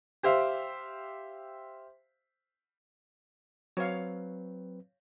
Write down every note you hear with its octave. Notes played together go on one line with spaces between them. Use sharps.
G4 C5 E5 F5
F#3 C4 B4 C#5 F5